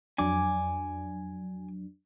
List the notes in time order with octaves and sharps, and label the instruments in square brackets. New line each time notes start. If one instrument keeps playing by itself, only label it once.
[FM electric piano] F2 F#3 D4 [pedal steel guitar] G#5 D6